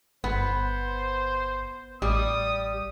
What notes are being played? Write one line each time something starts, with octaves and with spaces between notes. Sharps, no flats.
G1 B3 C5
A1 G3 D#6